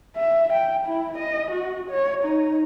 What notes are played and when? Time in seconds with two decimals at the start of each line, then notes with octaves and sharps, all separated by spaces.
0.17 E5
0.53 G5
0.86 E4
1.18 D#5
1.51 F#4
1.91 C#5
2.24 D#4